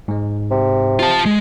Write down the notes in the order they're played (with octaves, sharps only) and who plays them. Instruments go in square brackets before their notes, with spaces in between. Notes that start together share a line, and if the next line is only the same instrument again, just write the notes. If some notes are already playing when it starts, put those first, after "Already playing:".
[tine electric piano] G#2 G#3
[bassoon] C3
[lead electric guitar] F4 A5
G#3